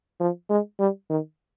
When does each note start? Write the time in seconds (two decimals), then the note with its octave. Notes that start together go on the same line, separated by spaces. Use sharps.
0.20 F3
0.50 G#3
0.79 G3
1.10 D#3